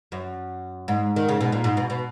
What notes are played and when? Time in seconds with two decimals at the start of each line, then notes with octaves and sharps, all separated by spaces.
0.12 F#2
0.88 G#2
1.16 D#3
1.29 C#3
1.41 B2
1.52 A#2
1.64 G#2
1.77 B2
1.90 B2